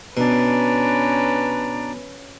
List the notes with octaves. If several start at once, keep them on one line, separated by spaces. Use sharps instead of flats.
B2 C#4 D4 B4 A#5